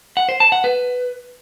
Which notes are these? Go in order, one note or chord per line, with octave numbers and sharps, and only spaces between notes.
F#5
C5
A5
F#5
B4